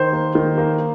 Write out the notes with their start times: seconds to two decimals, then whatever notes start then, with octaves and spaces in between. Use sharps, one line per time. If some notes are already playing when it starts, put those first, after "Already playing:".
Already playing: D#3 C5
0.13 A#3
0.35 D#3
0.58 A#3